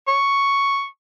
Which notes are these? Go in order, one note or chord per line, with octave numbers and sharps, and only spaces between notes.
C#6